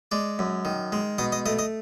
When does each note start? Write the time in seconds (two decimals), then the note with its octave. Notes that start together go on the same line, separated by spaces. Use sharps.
0.11 G#3 D5
0.39 F#2
0.65 D#3
0.92 G#3
1.18 B2 D#5
1.32 D#5
1.46 A3 D#5
1.59 D#5